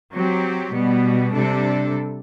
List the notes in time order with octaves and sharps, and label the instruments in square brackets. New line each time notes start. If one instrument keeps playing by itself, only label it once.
[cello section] F#3 C4 G4
B2 G3 B3
C3 G3 D4 A4